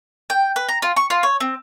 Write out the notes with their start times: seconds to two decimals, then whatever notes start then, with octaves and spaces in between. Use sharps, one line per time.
0.30 G5
0.56 B4
0.69 A#5
0.82 F4
0.96 C#6
1.10 F4
1.23 C#5
1.40 C4